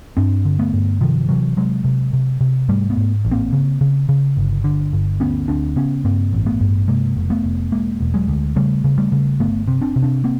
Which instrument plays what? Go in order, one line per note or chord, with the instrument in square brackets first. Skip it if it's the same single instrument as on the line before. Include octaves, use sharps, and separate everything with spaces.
[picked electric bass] G2 C4 D4
D3
A3 B3
G2
C3 D#3 F3
C3 E3 F#3
C3 F#3 G#3
C3
C3
C3
G#2 G3 A3
A3 B3
G#2
A1
A#3 C4
C#3
C#3
C#3
G1
D3
G1
D2 B3 C#4
D2 C4 D4
C#3 B3 C#4
G2 A#3 C4
A1
A3 B3
G2
C3 G#3 A#3
F1
A3 B3
F1
E1 G#3 A#3
E1
F#3 G#3
D2
C#3 G3 A3
C#3
G3 A3
C#3
G1 A3 B3
C3
C4 D4
C3
C4 D4
A#3 C4